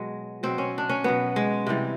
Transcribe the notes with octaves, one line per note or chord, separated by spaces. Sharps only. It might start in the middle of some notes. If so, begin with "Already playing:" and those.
Already playing: B2 F#3 G#3
B2 F#3 C4
C#4
D4
C#4
B2 F#3 B3
G#3
C3 E3 G3